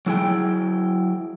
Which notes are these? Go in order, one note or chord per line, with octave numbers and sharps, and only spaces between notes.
F#3 E4 G#4 G5